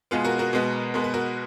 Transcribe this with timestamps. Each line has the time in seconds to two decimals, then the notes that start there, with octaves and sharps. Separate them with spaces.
0.11 B2 G#3 B3 F4 G#4
0.25 F#4 A#4
0.39 F#4 A#4
0.53 B2 G#3 B3
0.94 B2 G#3 B3 A#4
1.04 B4
1.14 F#4 A#4